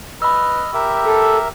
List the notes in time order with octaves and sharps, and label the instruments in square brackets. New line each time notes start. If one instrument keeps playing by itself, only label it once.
[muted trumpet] B4 [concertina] D#5 F6 [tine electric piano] B5 E6
[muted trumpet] G4 [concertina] A#4 E5
[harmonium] A4